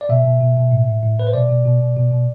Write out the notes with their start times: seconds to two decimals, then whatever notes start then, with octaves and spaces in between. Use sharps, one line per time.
0.01 D5
0.09 B2 E5
0.25 B2
0.40 B2
0.57 B2
0.71 A2
0.87 A2
1.03 A2
1.19 A2 B4
1.27 C5
1.34 B2 D5
1.49 B2
1.65 B2
1.81 B2
1.96 B2
2.11 B2